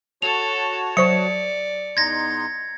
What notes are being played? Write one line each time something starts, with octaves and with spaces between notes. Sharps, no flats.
F#4 A4 C#5 A5 F7
F#3 C5 D5 C#6 C#7
E2 D#4 C6 G#6 A#6